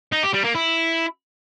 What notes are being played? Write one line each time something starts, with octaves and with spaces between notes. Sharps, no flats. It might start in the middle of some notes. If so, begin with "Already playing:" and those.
D#4
G4
G3
A#3
E4